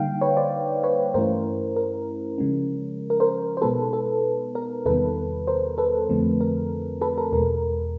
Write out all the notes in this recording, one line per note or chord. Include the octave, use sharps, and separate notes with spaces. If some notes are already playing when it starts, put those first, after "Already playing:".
Already playing: D3 G3 A#3 D#4 F5 G5
B4 C#5
C5 D5
B4 C#5
G2 E3 A3 C#4 E4 A#4 C5
A#4
C#3 F3 G#3 C#4
A#4
A#4 C5
C5
B2 G#3 B3 D#4 A4 B4
A4
A#4
E2 C3 D#3 G3 B3 A4 B4
A#4 C5
A4 B4
F2 D3 F3 A3 C4
A#4
A4 B4
A#4
E2 B2 G#3 A#4